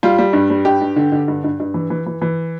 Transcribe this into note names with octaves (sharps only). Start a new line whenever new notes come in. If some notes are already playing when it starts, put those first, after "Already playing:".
G3 F4
G3
G2
G3
G2 G4
G2
D3
D3
G2
G2
G2
E3
E3
E3
E3